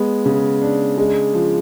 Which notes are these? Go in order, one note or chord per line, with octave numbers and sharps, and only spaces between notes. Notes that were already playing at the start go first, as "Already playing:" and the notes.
Already playing: G#3 B3
C#3
D4
G#3
F3